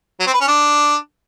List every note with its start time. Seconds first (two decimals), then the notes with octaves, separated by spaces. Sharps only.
0.20 F#3
0.27 C4
0.34 B4
0.41 C#4
0.48 D4